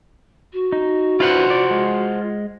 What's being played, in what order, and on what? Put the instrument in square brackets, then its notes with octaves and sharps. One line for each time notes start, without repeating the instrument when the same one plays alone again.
[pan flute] F#4
[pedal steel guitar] D#4
[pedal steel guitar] D4 E4 B4 [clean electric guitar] F4 C5 F#5
[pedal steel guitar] D5
G#3